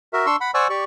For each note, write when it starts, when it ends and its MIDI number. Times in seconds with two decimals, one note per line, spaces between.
0.13 0.26 66
0.13 0.26 70
0.13 0.26 76
0.26 0.36 62
0.26 0.36 84
0.26 0.36 85
0.26 0.36 88
0.41 0.51 78
0.41 0.51 83
0.54 0.68 72
0.54 0.68 74
0.54 0.68 78
0.54 0.68 80
0.54 0.68 85
0.54 0.68 88
0.70 0.84 67
0.70 0.84 74
0.70 0.84 85